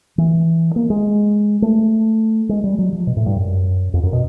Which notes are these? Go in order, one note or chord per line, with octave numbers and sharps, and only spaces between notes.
E3
A#3
G#3
A3
G#3
G3
F#3
F3
B2
A2
G2
F#2
F2
F#2
B2